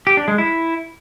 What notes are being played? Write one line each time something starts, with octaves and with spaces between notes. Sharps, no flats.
G4
D4
G#3
E4